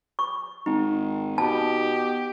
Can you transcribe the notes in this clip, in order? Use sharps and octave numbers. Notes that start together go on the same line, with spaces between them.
C#6
G#1 D#4
B2 G4 A5